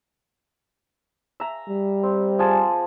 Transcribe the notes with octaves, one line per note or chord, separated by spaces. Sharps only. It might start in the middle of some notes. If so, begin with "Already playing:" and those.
E5 A#5
G3
C4
F3 G#4 A5